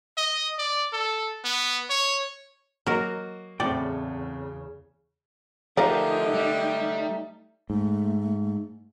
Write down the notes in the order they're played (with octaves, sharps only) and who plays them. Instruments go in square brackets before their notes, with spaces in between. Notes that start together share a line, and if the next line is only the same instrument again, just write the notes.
[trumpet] D#5
D5
A4
B3
C#5
[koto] F#3 A#4 [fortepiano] A#3 F#4 D#5
[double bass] E2 C#3 [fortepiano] A2 [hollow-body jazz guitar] C4 F#4 G5 [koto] D5
[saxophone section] D3 G4 [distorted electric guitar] F3 [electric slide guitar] A3 D#4 [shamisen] F4 A#4 D5
[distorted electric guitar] G3
[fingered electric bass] G#2 [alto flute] A3